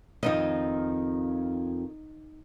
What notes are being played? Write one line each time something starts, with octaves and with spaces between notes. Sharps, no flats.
F2 D#3 F3 D#4 D#5